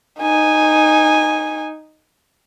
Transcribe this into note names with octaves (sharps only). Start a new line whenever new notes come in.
D#4 G#5